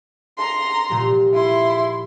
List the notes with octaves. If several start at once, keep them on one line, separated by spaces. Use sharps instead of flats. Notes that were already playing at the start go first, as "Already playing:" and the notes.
A#5 C6
A#2 F3 G3
E4 C6